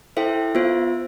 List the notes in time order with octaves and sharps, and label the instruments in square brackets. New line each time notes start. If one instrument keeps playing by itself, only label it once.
[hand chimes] E4 A4 C5 E5 G5
B3 F4 C5 E5